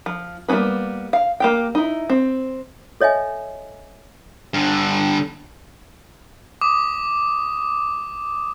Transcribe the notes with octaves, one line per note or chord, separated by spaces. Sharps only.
F3
G3 A#3 B3 C#4 B4
F5
A#3 G4 G5
D#4 E4
C4
A4 C#5 D#5 E5 G#5
G2 D3
D6 D#6